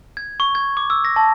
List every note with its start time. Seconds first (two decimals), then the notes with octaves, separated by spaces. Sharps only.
0.17 G#6
0.40 C#6
0.55 G#6
0.77 D6
0.90 E6
1.05 A#6
1.16 A5